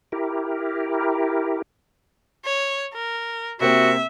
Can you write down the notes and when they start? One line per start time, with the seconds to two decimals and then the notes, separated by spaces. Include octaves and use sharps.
0.12 E4 G4 A#4
2.45 C#5
2.94 A#4
3.61 C3 A#3 C4 F#4 E5